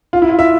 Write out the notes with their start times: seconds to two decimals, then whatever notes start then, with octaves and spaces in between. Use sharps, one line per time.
0.13 F4
0.22 E4
0.30 F4
0.39 E5